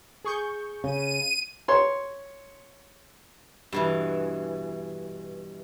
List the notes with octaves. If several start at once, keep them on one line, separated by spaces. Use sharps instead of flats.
G#4 C#6 G6
C#3 D#7
C#5 C6
G2 B2 E3